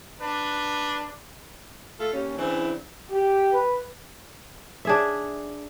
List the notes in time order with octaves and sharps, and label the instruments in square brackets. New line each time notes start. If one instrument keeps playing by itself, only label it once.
[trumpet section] D4 B4
[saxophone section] A3 F4 A4
D#2 C#4
C#3 E3 C4 D4 E4
[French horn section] G4
[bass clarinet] B4
[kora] D4 G#4 E5